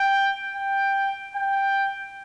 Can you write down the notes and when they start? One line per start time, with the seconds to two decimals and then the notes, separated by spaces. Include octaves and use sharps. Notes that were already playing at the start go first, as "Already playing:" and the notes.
Already playing: G5
0.56 G5
1.36 G5